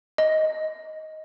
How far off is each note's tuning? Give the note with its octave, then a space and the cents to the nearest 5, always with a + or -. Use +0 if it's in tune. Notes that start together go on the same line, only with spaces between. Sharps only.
D#5 +10